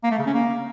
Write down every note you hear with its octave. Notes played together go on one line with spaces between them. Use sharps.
A#3
A3
C#3
C#4
A#3